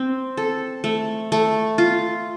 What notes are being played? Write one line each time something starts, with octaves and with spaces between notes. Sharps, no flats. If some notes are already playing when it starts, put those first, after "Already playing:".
Already playing: C4
A4
A3
A3
F4